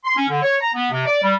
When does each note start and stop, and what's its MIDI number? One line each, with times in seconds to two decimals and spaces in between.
0.04 0.14 84
0.16 0.25 61
0.29 0.42 50
0.42 0.55 73
0.60 0.69 82
0.74 0.88 59
0.91 1.03 48
1.06 1.21 74
1.22 1.34 55